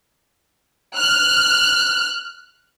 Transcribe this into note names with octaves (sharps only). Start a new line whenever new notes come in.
F6 F#6